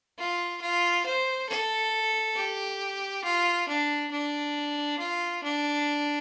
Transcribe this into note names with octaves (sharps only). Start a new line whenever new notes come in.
F4
F4
C5
A4
G4
F4
D4
D4
F4
D4